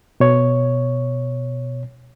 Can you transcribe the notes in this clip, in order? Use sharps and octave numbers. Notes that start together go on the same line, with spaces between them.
B2 C#5